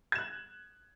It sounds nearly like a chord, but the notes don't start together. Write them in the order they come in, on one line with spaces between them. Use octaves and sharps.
G#6 E7 F#6